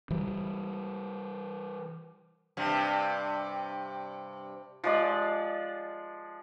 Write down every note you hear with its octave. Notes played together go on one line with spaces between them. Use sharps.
E3 G3
G2 C3
F3 G#3 D5